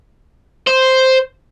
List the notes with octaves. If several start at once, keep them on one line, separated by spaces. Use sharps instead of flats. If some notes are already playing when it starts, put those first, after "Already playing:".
C5